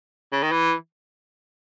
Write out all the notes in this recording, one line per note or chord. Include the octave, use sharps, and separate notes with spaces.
C#3
D#3
E3